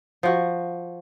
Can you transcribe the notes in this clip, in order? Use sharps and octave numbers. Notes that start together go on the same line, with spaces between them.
F3 F#4